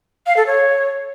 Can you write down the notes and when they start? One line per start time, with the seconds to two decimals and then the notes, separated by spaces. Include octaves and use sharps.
0.27 F5
0.37 A4
0.47 C#5